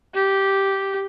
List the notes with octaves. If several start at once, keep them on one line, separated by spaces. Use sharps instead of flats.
G4